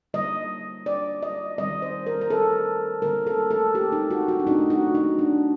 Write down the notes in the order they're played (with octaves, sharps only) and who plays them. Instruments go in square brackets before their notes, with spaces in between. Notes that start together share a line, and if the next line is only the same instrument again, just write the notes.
[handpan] D3 G3 A#3 D#5
D5
D#5
D#3 G3 C4 D#5
C5
A#4
A#4
A4
D3 G3 A#3 A#4
A4
A4
G4
D#4
F#4
F#4
D4
A#2 A3 C4 D#4
F#4
D#4
D4